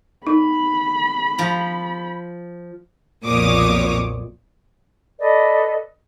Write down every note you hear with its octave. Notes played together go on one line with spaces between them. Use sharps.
D#4 B5
F3 A#5
B1 F2 A#2 C#5 D6 D#6
A4 B4 D5 D#5